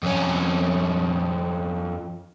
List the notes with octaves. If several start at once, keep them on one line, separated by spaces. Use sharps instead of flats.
F2 C#4